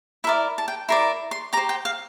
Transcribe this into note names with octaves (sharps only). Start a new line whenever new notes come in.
E4 A#4 D5 E5
A5
G5
E4 A#4 D5 C6
C6
G4 C5 A#5
G5
F5